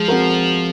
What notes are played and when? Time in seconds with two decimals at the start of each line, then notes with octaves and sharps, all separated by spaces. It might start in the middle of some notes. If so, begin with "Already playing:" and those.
Already playing: F3 G#3
0.08 C4 F#4 A#4